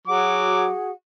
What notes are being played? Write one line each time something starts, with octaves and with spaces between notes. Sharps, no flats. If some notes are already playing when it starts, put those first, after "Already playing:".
F#3 F#4 G#4 F#5 D6